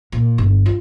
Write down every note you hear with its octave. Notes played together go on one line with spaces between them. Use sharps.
A#2
G1
F4